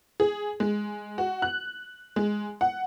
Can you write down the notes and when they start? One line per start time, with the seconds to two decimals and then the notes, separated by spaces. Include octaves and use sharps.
0.20 G#4
0.60 G#3
1.18 F#4
1.42 F#6
2.16 G#3
2.61 F#5